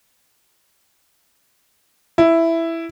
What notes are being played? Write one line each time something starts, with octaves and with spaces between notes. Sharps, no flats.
E4